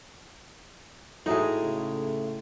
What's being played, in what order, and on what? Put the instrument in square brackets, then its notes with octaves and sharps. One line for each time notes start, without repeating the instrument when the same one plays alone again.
[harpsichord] A2 [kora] G#3 D#4 [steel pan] E4 F#4
[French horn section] C#3 A3